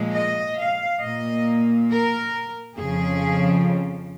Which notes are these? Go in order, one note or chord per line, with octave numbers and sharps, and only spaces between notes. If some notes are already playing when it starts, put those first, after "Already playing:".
Already playing: A#2 F3 G#3
D#5
F5
A#2 A#3 D#5
A#4
F2 C#3 F3 G#4